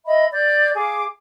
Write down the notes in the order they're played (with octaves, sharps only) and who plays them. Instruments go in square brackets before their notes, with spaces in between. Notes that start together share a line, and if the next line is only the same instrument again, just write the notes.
[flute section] D#5 E5 B5
D5 G6
G#4 F5 D6